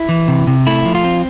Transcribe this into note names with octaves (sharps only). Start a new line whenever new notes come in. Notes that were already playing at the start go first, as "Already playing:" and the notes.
Already playing: E4
E3
C3
C3
A3 E4
F3
F4
C4